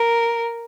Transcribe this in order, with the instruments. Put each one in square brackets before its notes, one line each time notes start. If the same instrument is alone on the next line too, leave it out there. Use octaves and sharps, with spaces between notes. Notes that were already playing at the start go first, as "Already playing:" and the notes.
Already playing: [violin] A#4